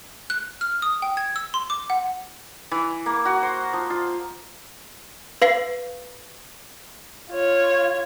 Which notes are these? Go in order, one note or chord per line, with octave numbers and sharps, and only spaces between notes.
F#6
F6
D#6
G5
G#6
E6
C6
D6
F#5
E3
A#3
F#4
C5
F3
F4
B4 F5 C7
F4 C#5